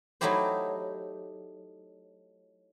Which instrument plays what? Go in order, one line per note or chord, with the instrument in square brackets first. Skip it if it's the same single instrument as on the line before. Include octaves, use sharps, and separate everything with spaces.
[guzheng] F#3 A3 D#4 E4 G4 C5